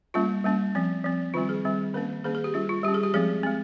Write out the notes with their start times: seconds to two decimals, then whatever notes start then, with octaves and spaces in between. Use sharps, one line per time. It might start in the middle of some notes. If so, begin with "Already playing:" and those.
0.14 G3 A#3 C#4 F4
0.44 G3 A#3 C#4
0.75 F3 C4
1.04 F3 C4
1.34 D#3 G3 C4 F4
1.49 G#4
1.65 D#3 G3 C4
1.94 D#3 A#3 C#4 A#4
2.24 D#3 A#3 C#4 G#4
2.35 G#4
2.44 G4
2.54 G3 C#4 F4
2.69 F4
2.83 G3 G4
2.88 C#4
2.94 G#4
3.03 G4
3.14 F3 G#3 C4 G#4
3.43 G#3 C4